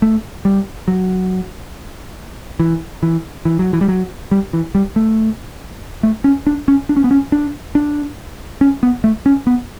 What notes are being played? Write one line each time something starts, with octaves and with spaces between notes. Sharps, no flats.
A3
G3
F#3
E3
E3
E3
F#3
E3
G3
F#3
G3
E3
G3
A3
A3
C#4
D4
C#4
D4
C#4
B3
C#4
D4
D4
C#4
B3
A3
C#4
B3